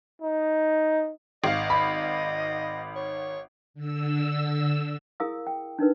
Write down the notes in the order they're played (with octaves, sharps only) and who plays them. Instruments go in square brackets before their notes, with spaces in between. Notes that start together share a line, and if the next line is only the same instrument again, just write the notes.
[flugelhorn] D#4
[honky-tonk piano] G#1 F5 [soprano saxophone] D#5
[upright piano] B5
[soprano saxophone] C#5
[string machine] D3 E6
[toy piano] E4 G#4 A#4 F5 D#6 E6
G5
D4 D#4 A#4 B4